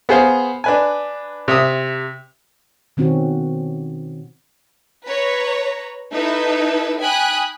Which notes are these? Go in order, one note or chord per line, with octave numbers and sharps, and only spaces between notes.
B3 G#4 C5 F5
D4 B4 G#5
C3 E5 D#6
B2 D#3 C4 C#4 F#4
B4 C#5 A#5
D#4 E4 A4 B4 E5
G5 G#5 B5 D#6 F#6